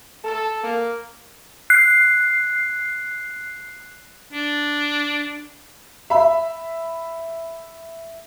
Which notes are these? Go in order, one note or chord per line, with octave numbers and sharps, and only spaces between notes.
A4
A#3
F#6 C7
D4
E5 B5